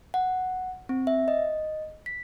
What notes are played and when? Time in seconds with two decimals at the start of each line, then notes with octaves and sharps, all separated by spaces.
0.14 F#5
0.89 C4
1.07 E5
1.28 D#5
2.06 B6